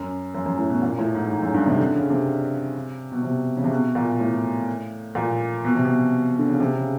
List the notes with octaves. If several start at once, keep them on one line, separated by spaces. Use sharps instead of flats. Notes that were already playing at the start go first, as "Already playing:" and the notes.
Already playing: F#2
F#2
F#2
A2
B2
A#2
A2
G#2
G#2
F#2
G2
C3
D3
C#3
C3
B2
C3
C#3
C3
B2
A#2
A2
A#2
B2
C3
B2
D3
C#3
C3
C#3